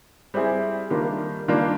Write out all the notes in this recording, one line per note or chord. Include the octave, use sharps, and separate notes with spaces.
G3 C4 E4 G#4
D#3 G3 A#3 D4 F4
D#3 G3 A#3 D4 F4